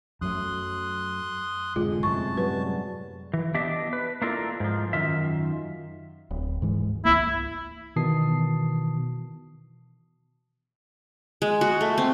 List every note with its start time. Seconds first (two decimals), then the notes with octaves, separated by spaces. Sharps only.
0.21 F#2 F#3 A3 C6 D#6 F#6
1.76 F1 G#2 D3 G#3 F4
2.03 F#2 A2 C3 A5 C#6
2.37 F#3 G3 F#4 B4
3.33 E3
3.54 B3 D4 G4 D#5 E5
3.93 B4
4.22 A#3 D4 E4 F4 A4 A#4
4.60 G#2 F3
4.93 F#2 D#3 F4 E5
6.31 D1
6.62 G#2 E3 G#3
7.05 C#2 A#3 E4
7.96 B2 D#3 E3 A5 D#6 C7
11.42 G#3
11.61 F#4
11.81 A3
11.98 C4